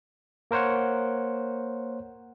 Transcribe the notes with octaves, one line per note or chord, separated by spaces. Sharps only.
A#3 A#4 C5 C#5 F#5